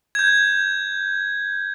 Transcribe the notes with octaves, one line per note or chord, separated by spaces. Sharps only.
G6 G#6